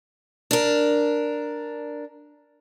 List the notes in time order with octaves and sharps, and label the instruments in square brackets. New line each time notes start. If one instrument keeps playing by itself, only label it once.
[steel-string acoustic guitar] D4 A#4